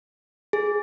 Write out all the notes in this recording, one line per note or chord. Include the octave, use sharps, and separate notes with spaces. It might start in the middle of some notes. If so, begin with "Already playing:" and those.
G#4